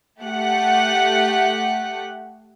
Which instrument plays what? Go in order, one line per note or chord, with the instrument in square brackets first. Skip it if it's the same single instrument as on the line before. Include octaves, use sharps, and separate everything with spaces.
[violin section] A3 G4 F#5